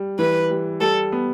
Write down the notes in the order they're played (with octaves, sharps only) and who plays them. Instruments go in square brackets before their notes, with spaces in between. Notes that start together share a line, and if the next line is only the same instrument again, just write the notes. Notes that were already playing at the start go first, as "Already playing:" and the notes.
Already playing: [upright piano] G3
[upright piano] E3 [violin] B4
[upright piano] G3
[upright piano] G3 [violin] A4
[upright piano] B3